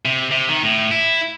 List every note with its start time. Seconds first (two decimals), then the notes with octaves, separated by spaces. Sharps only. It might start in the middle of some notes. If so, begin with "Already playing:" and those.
0.05 C3
0.31 C3
0.48 D#3
0.63 A2
0.91 E4